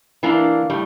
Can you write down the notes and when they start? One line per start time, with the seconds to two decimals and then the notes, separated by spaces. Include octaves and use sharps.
0.23 E3 A#3 D4 F4
0.70 A2 G3